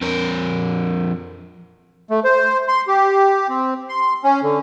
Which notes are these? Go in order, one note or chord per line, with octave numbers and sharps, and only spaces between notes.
F2 A#4
A3
C5
C6
G4
C4
C6
C#4
D3